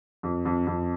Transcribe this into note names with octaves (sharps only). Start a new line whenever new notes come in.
F2
F2
F2